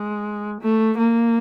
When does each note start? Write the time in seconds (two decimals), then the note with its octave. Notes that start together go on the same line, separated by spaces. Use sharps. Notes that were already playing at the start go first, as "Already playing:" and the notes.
Already playing: G#3
0.61 A3
0.98 A#3